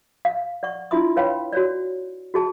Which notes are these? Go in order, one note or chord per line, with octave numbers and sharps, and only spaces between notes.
F5
D5 F#5 C#6
D4 E4 F4 E5 C6 D#6
B4 C#5 F5 G5 B5 C6
F#4 C#5 D5
F#4 G#4 A5